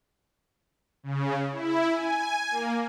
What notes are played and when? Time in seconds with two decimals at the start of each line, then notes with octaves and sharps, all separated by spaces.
1.03 C#3
1.52 E4
1.91 G#5
2.51 A#3